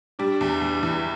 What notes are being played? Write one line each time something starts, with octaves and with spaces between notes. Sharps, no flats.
G3 D4
E2
E2
E2 E3